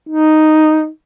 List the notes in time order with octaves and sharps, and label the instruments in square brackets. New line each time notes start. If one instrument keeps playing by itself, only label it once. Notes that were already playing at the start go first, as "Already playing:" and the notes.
[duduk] D#4